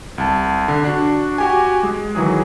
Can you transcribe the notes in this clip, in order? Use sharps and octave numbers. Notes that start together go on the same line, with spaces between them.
C2 A5
D3
D4 F#4
F#4 G4 G#5
G#3
D#3 E3 F#3 G#4